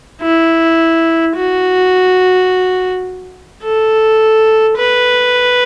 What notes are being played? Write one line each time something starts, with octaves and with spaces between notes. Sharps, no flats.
E4
F#4
A4
B4